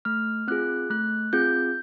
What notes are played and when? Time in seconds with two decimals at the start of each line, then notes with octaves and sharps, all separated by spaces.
0.05 A3 F6
0.48 C4 F4 G#4 F#6
0.90 A3 F#6
1.33 C4 F4 G#4 G6